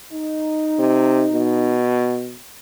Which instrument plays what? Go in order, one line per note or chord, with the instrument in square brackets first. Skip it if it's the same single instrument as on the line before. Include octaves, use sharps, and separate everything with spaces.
[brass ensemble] D#4
[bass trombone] C3
B2